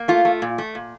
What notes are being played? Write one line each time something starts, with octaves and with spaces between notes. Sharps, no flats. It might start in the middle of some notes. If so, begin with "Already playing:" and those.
Already playing: A#3
A3 F4
A3
A#2
A3
A#2